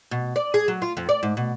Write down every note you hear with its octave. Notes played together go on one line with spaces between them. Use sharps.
B2
D5
G#4
F#3
F4
F2
D5
G#2
B2